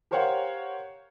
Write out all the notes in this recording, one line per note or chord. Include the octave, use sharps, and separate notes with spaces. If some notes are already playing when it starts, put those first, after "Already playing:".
G4 A#4 C5 C#5 F5 F#5